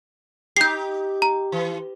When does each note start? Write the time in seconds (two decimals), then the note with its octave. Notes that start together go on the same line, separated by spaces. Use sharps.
0.57 D#4 G4 G6 C7
1.22 A#5
1.52 E3